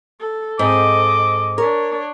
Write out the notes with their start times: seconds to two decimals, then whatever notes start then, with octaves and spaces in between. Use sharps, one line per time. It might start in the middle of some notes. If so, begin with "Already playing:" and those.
0.20 A4
0.59 G#2 C4 A4 D#5 D6
1.58 D4 A#4 C#5